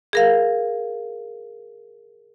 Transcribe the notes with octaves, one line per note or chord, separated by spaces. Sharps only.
G#4 A#4 F5